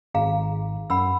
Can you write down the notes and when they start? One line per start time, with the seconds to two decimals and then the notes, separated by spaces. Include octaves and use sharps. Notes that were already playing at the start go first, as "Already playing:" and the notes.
0.14 G#1 G#4 F5 A#5
0.90 F#2 F#5 B5 E6